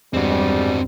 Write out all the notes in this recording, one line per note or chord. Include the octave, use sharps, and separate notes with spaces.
E2 G2 G3 G#3 C4 F#4